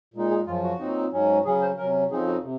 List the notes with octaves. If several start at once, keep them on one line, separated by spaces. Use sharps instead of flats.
A#2 G#3 D#4
G#4
F#2 C#3 F3 F4
F#4
A#2 F#3 C4 D#4
G#2 F#3 C#4
C#3 F#3 C#4 G#4
C5
C3 F#3 C#4 A#4
F2 C#3 F3 C4 D#4 G#4
F#4
C3